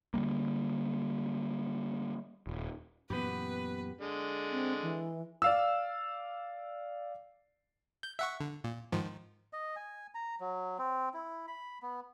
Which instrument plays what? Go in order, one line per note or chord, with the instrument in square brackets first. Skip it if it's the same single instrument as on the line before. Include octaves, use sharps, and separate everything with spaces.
[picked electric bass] D3 F3 G3 A#3
D#1
[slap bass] F#2 A#2 E3 [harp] B3 G4 [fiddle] B4
[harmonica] D3 G#3
[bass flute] C4
E3
[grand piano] D5 F5 E6
[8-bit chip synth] G6
E5 F#5 C#6
D3
A#2
G#2 D#3 F3
[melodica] D#5
G#5
A#5
F#3
C4
E4
B5
B3